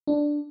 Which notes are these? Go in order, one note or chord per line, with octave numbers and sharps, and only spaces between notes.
D4